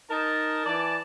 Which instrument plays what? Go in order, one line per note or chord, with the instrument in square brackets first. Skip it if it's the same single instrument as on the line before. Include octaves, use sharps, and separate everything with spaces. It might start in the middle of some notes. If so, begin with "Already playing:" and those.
[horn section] D#4 A#4 A5
E3 D5 A5